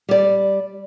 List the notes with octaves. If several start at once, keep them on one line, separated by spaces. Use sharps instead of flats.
G3 D5